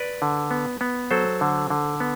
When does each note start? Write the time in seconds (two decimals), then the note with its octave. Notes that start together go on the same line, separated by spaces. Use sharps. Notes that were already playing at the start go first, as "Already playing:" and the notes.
Already playing: B4 D5
0.22 D3
0.51 B3
0.81 B3
1.11 F#3 A4 C5
1.41 D3
1.70 D3
2.00 B3